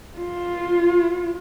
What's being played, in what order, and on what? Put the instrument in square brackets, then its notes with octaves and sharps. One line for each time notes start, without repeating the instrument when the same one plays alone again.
[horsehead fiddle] F4